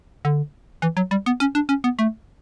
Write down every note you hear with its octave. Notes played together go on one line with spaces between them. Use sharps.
D3
E3
F#3
G3
B3
C#4
D4
C#4
B3
A3